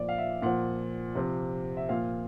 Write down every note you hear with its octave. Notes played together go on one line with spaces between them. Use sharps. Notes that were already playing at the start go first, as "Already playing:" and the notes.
Already playing: A#2 F3 D5
F5
E5
A#2 F3 F#5
C3 F3
E5
A#2 F3 F5